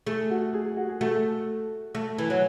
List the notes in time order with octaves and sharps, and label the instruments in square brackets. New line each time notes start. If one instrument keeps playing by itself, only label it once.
[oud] A3 [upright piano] G#4
[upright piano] F#4
G#4
G#4
F#4
G#4
[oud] A3 [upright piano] F#4
[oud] A3
E3
F#3